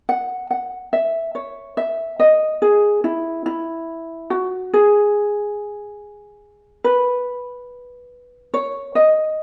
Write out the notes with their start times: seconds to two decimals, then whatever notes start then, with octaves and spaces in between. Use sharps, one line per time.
0.09 F#5
0.51 F#5
0.93 E5
1.35 C#5
1.77 E5
2.20 D#5
2.62 G#4
3.04 E4
3.46 E4
4.30 F#4
4.74 G#4
6.84 B4
8.54 C#5
8.95 D#5